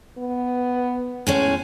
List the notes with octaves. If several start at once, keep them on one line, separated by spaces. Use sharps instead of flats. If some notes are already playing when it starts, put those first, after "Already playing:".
B3
A2 G#3 C#4